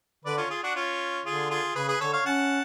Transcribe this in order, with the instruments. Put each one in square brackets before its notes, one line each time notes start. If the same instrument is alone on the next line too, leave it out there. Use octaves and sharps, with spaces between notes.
[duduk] D3 [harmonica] B4 D5
[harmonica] C#4 F4
F4 G#4
D4 F#4
C#4 F4
[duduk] D3 [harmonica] F4 G#4
[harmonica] F4 G#4
[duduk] C#3 [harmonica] G#4 B4
[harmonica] G#4 B4
[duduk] D3 [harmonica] A4 C#5
[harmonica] C#5 F5
[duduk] C#4 [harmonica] F#5 A5